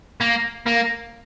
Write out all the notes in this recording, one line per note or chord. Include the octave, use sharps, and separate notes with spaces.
A#3
A#3